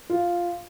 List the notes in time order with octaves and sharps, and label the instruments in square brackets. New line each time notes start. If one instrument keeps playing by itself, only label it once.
[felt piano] F4